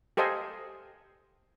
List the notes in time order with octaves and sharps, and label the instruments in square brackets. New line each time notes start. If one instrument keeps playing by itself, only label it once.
[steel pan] G4 A4 C5 D#5 F5 G#5